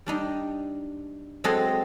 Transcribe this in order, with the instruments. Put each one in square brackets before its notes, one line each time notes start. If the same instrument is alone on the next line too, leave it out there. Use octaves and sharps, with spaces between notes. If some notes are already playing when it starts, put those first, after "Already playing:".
[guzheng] G3 D4 D#4
F#3 G#3 C4 G#4 A4 D#5